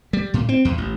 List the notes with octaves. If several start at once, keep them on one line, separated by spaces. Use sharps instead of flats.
G3
A2
C4
E2
A1